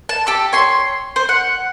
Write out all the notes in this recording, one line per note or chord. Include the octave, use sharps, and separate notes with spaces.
A5
G4 A4
C#5 C6
C5
F#5